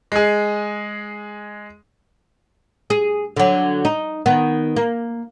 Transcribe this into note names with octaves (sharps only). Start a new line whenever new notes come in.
G#3 G#4
G#4
D3 F#3
D#4
D#3 B3
A#3